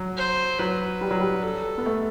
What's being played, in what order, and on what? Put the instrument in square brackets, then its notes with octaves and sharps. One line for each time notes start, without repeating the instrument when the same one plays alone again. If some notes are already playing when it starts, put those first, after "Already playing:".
Already playing: [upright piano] F#3
[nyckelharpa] C5
[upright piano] F#3 [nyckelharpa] B4
[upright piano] G3
F#3
G3
[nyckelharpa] A4
[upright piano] B3
A3